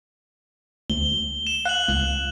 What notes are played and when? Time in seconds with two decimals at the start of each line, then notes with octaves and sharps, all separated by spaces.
0.90 D2 G7
1.47 E7
1.65 F5 F#6 F#7
1.88 C#2